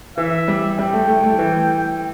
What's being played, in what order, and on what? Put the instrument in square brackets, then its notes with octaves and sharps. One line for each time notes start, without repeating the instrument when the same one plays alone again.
[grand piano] E3 [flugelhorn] E5
[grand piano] G3
[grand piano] G3 [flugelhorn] G5
[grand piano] A3
A3
A3
E3